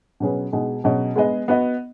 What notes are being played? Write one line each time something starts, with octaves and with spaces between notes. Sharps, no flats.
B2 F#3 C#4 G#4 B4
B2 G#3 D#4 G#4
B2 F#3 C#4 G#4 D#5
G#3 B3 G#4 D#5
B3 F#4 D#5